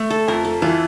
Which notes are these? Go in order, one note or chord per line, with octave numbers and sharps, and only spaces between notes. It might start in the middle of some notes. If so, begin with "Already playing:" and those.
Already playing: A3
A4
F2 A#4
A4
E3 F4